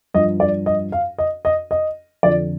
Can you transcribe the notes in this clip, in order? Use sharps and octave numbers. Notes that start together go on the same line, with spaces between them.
G2 F3 D#5
D5
D#5
F5
D#5
D#5
D#5
F2 D3 F3 D5